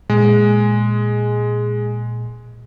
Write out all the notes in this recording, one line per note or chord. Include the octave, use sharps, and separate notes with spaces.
A#2 G#3